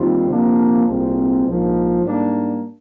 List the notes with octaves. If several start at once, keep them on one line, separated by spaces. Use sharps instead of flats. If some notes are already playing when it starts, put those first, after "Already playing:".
Already playing: D#2 D#3 G3 C4 F4
C3 F3 A#3 D4
C2 A#2 G#3 C4
A#1 G#2 F3 A#3
G#2 G3 A#3 D4